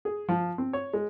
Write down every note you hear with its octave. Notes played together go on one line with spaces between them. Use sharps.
G#4
F3
C4
C#5
G#3